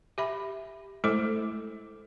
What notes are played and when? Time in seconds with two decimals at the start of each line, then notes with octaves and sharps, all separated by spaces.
0.18 G4 E5 B5
1.04 G#3 A3 E4 A4 C5 D6